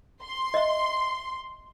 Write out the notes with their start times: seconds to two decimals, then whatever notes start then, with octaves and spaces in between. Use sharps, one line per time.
0.23 C6
0.54 D#5 E5